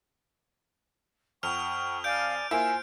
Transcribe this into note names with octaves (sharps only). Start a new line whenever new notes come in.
F2 F#5 G5 C#6 F6 F7
D5 F5 G#5 D6 G6 D7
A#3 E4 F4 C5 G#5 D7